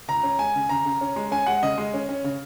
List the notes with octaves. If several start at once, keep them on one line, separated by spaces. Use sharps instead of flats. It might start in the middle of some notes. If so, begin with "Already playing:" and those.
C#2 A#5
C#4
G#3 G#5
C#3
C#3 A#5
C#3
C#4
G#3
C#4 G#5
G#3 F#5
C#3 D#5
G#3
C#4
C#4
C#3